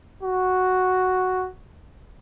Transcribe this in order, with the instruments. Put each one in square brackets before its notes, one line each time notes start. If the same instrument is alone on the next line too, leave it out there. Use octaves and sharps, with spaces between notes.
[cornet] F#4